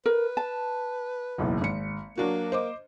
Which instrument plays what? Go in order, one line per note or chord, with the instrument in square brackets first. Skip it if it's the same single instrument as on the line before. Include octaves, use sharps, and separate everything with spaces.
[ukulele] A#4 [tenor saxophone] B4
[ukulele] A5
[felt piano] F#1 B1 E2
G#1 C#7
[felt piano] F#3 D4 F#4 [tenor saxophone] A#3
[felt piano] C5 D#5 D6